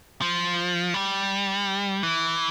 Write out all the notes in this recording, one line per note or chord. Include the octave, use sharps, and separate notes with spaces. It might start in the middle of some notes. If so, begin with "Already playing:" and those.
F3
G3
E3